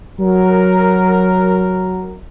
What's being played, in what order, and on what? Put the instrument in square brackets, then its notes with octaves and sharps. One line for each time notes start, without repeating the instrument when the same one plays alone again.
[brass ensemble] F#3 F#4 A#4